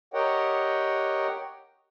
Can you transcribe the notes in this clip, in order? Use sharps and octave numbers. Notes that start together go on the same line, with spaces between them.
G4 A#4 C#5 D#5 F#5 G5